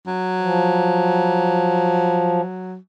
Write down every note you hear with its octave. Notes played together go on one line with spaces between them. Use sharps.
F#3
F3